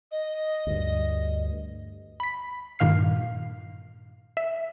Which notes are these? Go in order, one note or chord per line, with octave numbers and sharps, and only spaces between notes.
D#5
D2 G2
B5 B6
G2 A#2 D#3 F5 F6 C7
E5